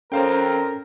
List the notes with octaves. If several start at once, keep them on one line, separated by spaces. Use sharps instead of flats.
F2 C#4 A4 A#4 C5 F5 G5